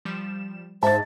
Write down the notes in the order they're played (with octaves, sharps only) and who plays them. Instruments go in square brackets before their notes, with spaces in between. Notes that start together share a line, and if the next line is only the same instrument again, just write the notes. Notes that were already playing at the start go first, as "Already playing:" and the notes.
[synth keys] F3 G3 E7
[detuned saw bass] G#2 [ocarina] C5 [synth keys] E5 [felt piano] A5 A6